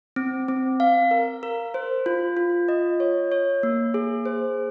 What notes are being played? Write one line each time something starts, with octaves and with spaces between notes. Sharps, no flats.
C4
C4
F5
A#4
A#4
C5
F4
F4
D#5
C#5
C#5
A#3
G#4
C5